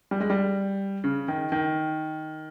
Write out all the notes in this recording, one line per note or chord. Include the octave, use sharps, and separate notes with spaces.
G3
G#3
G3
C#3
D#3
D#3